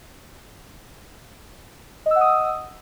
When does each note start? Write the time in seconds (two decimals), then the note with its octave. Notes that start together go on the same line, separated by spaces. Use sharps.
2.06 D#5
2.11 E6
2.16 F#5
2.21 D#6